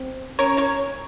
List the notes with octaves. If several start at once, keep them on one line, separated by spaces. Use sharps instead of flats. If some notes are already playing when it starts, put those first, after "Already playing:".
Already playing: C4
C#4 A#4 C#5
A#4 C#5